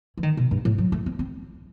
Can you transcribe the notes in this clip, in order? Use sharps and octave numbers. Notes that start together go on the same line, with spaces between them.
E3
D#3
B2
G2
A2
F#3
A3
C4
C4